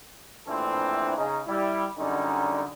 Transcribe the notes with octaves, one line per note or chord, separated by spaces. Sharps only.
A#1 A2 E3 C4 D4 A4
C#3 D#4
G3 E4
F#2 D3 G3 C#4 D#4